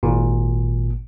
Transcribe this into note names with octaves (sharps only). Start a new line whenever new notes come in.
G#1 A#2